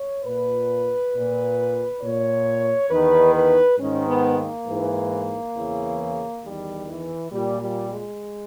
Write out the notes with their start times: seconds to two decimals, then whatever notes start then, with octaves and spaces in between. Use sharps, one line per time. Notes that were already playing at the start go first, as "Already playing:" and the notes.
Already playing: C#5
0.25 A#2 B4
1.14 A#2
2.02 A#2 C#5
2.90 E2 D#3 B4
3.34 B4
3.78 G#2 D#3 C#4
4.07 B3
4.37 A#3
4.67 G#2 E3
5.55 E2 C#3 E3
6.43 E2 D#3 G3
6.87 E3
7.32 A#2 G3
7.61 G3
7.90 G#3